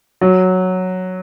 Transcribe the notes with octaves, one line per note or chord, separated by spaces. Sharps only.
F#3